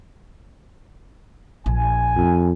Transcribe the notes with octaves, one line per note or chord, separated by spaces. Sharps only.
A#1 G#5
F2